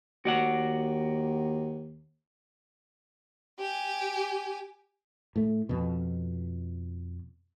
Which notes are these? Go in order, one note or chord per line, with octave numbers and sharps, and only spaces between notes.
D#2 F#4 D5 F#5
G4 G#5
A2 A3
F2 B2